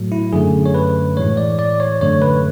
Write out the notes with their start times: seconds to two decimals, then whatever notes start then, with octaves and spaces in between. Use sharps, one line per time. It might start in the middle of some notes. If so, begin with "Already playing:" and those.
Already playing: A2 F#3 A3
0.12 E4
0.33 F#2 D3 A3 G#4
0.66 C#5
0.74 B4
1.17 A2 E3 G#3 C#5
1.37 D5
1.59 D5
1.80 C#5
2.01 F#2 D3 A3 C#5
2.22 B4